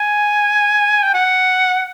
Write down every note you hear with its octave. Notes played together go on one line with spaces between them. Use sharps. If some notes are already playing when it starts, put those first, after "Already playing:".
Already playing: G#5
G5
F#5